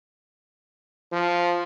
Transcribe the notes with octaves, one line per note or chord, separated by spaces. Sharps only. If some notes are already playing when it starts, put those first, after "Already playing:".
F3